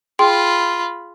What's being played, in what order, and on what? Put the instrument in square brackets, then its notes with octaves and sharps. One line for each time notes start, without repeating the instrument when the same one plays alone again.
[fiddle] F4 B5 [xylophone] G#4 G5 C6